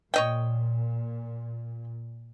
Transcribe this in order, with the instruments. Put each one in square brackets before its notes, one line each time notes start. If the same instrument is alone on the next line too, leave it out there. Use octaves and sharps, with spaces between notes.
[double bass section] A#2 [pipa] C#5 D#5 G5